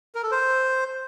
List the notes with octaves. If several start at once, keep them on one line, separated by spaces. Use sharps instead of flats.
A#4
A4
C5